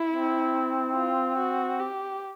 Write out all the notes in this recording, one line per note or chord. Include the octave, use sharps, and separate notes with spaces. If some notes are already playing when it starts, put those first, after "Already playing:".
Already playing: E4
C4
F4
F#4
G4